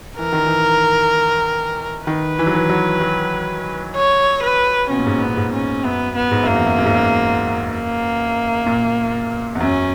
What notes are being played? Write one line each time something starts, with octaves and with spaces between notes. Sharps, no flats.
E3 A#4
D#3
E3
D#3 B4
E3
F#3
E3
F#3
F#3
C#5
B4
B2 C#4
A#2
G#2
A#2
B3
G#2
C#4
F#2 B3
B3
G#2
F#2 A#3
E2
F#2
F#2
G#2
F#2
A#3
A#2
E2
F#2 C#4